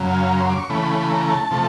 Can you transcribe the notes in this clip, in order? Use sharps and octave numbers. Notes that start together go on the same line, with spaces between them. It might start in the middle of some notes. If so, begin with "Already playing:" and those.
Already playing: F#2 C#3 F#3
F5
A#5
C6
D6
C#6
C#3 E3 A3 B5
A#5
A5
C3 F3 A3